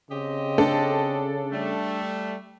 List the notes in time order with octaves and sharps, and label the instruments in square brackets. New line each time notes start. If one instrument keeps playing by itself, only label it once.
[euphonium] C#3 [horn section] C4 G4 D#5
[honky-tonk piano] D4 A4
[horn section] G3 A3